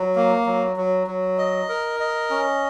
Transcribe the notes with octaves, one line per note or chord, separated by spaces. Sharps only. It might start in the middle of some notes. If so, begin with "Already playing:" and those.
Already playing: F#3
A#3
F#3
F#3
F#3
D#5
A#4
D#5
C#4